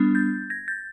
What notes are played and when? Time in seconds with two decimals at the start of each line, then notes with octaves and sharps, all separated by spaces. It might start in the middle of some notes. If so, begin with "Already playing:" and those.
Already playing: G3 B3 D4
0.15 G6 A6
0.50 G#6 A#6
0.68 G6 A6